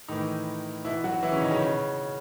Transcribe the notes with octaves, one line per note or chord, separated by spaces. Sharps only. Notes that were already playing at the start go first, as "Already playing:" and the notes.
A2 D#3 E3 D#4
B2 E3 E4
F#3 F#4
E3 E4
C#3 C#4
D#3 D#4
C#3 C#4
B2